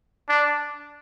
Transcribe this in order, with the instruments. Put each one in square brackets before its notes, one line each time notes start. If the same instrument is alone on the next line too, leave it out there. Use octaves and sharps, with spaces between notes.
[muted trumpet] D4